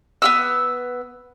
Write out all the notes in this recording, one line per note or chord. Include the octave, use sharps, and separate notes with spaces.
B3 F4 E6